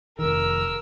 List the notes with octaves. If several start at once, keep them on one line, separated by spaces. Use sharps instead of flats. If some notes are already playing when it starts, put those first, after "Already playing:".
F1 D#3 A#4 E6